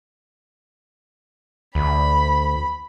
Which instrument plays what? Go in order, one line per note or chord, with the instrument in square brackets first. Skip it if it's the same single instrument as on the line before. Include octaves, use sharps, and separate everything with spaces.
[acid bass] D2 [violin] B5